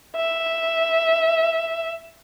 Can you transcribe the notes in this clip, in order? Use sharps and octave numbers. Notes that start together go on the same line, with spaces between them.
E5